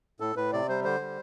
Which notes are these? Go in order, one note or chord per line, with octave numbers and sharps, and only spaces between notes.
A2 A4
A2 B4
C3 D5
G3 C5
D3 C5
G3